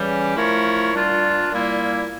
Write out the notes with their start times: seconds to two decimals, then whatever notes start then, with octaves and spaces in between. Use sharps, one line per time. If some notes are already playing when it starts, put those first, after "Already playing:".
Already playing: C#3 E3 G3 C#4 G4
0.36 F3 A3 E4 A#4 C#5
0.93 A#2 G3 D4 F4
1.51 A#2 G3 A#3 E4